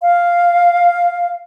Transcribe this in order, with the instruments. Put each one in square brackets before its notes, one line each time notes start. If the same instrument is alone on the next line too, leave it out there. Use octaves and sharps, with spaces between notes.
[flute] F5